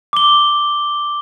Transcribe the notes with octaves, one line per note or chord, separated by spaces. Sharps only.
D6 G7